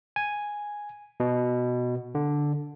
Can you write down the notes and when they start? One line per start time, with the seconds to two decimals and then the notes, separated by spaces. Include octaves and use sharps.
0.16 G#5
1.20 B2
2.15 D3